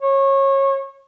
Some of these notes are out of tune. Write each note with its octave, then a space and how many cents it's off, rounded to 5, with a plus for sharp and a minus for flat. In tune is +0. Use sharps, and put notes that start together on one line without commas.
C#5 -25